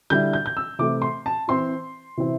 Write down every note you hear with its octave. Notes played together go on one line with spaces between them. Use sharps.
D3 G3 E4 G6
G6
G6
E6
C3 E3 A3 C4 E4 D6
C6
A5
E3 C4 E4 C6
C3 E3 C4 E4